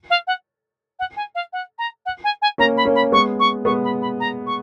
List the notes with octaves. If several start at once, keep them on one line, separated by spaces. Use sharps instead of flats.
F5
F#5
F#5
G#5
F5
F#5
A#5
F#5
G#5
G#5
A#3 C#4 A#5
B5
A#3 C#4
B5
G#3 B3 C#6
C#6
G#3 B3 C#6
B5
B5
A#5
C#6